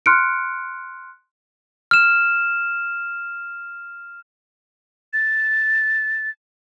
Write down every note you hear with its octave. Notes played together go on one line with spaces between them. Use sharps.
C6 F6 F#6 C#7 D7
F6 E7
A6